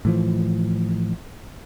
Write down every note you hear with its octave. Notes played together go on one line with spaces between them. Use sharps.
A2 E3 F3